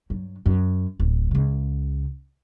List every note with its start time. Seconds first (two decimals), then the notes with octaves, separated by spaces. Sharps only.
0.10 G2 F#3
0.46 F#2
1.00 D1
1.31 C#2 C#3